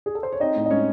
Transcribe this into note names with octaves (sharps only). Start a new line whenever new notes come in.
G#4
A4
C5
C#5
C4 D#4 D#5
A2
D#5
G#3 C#4 C#5